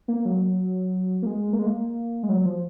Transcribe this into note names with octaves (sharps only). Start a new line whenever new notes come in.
A#3
F#3
A#3
G#3
A#3
G#3
A#3
G#3
F#3
F3